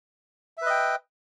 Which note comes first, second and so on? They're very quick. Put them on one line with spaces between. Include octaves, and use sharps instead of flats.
E5 B4 D#5 G5